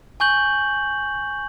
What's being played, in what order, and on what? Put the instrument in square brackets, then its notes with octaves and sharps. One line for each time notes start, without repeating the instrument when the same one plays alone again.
[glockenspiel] G#5 C#6 G6 F#7